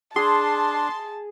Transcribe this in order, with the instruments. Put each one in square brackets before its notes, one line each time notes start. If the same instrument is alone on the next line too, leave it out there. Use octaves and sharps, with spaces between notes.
[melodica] D4 [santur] G#4 [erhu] A5 [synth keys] C6